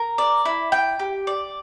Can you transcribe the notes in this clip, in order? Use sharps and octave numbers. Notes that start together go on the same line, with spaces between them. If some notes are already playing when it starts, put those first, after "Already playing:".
Already playing: A#4
D5
E4
G5
G4
D5